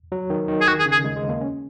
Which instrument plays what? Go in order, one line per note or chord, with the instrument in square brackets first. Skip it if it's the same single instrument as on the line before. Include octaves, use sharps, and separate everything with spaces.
[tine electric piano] F#3
D#3
D#3
[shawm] G#4
[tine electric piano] D#3 [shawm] F#4
[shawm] G#4
[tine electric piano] C#3
[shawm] G#4
[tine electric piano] G#3
G#3
A#3
C#4